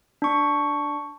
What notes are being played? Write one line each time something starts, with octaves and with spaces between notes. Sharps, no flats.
D4 C#6